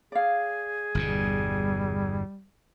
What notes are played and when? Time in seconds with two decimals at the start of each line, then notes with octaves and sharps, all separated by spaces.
0.12 G#4 D5 F5
0.95 G1 E2 B2 G3